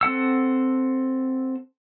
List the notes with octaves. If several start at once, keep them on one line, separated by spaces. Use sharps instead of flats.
C4 A4 F#5 E6